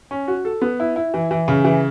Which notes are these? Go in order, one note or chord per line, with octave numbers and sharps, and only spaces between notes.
C#4
F#4
A4
B3
E4
E4
E3
E3
C#3
E3